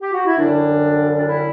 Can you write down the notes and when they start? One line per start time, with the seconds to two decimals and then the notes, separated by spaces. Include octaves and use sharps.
0.01 G4
0.12 F#4
0.25 E4
0.37 F#2 D3 G3 D4
1.16 D4
1.26 E4